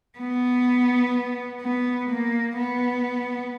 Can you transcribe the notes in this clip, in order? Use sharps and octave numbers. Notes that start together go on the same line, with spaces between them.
B3
B3
A#3
B3